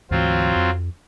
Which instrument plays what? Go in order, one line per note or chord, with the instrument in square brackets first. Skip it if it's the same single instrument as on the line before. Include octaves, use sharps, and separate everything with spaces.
[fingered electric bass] D2 G#2 E3 [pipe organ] F#3 C4 F4
[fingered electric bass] F2